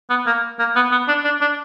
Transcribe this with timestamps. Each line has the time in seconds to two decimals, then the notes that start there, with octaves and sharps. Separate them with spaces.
0.10 B3
0.27 A#3
0.59 A#3
0.76 B3
0.92 B3
1.08 D4
1.24 D4
1.41 D4